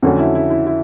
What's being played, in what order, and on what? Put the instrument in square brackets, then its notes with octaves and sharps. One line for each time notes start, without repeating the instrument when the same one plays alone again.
[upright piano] F2 D3 F#3 A3 C#4 [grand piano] F#4
[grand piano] E4
E4
E4
E4